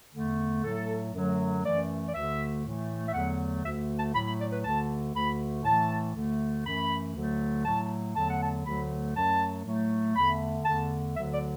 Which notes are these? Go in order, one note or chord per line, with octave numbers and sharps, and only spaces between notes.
E2 D3 A3
A2 F#3 A3 A4
F#2 D3 F#3 A3
F#2 E3 A3 D5
D5
D2 D3 A3 E5
A2 E3 A3
E5
E2 D3 F#3 A3 F#5
D2 D3 A3 E5
A5
A2 F#3 A3 B5
B5
D5
B4
D2 D3 A3 A5
D2 D3 A3 B5
A2 E3 A3 A5
D2 D3 A3
F#2 E3 A3 B5
D2 D3 F#3 A3
A2 F#3 A3 A5
E2 D3 F#3 A3 A5
F#5
A5
D2 D3 F#3 A3 B5
F#2 F#3 A3 A5
A2 F#3 A3
E2 D3 A3 B5
E2 D3 A3 A5
D2 D3 F#3 E5
D5